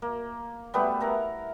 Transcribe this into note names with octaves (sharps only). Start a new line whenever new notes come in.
A#3
G3 A3 B3 B4
E4 A#4 F#5